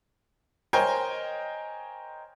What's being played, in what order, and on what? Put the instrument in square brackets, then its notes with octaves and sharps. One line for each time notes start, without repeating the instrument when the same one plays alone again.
[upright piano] A#4 C5 C#5 D#5 G5 G#5